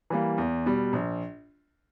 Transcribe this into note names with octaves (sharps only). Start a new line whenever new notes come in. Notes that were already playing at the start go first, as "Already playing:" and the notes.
E3 G3 A#3
E2
B2 G3
A#1